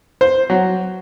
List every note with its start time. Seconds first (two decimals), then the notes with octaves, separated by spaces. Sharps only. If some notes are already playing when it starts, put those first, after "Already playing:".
0.21 C5
0.50 F#3